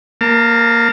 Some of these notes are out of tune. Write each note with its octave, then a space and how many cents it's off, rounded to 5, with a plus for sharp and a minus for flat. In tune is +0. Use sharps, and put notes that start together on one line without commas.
A#3 +0 A5 +40